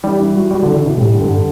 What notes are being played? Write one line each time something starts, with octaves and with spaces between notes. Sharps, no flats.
E3 G3
E3
F#4
G3 F#4
D3
E3
D3
B2 E3
A2 G3
D3
G2
D3